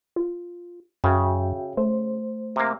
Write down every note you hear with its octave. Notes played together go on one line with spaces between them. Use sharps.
F4
F#2 C#3 F#4 E5 G5
A3 C5
C3 A#3